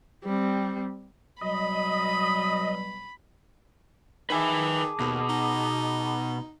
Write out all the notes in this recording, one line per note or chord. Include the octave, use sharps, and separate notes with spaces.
G3 C4
B2 F#3 G3 D#5 B5
D#3 G#4 B4 G#5 A5 D6
D#2 B2
D#4